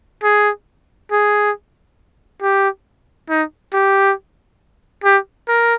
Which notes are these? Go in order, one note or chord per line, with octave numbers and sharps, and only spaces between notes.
G#4
G#4
G4
D#4
G4
G4
A#4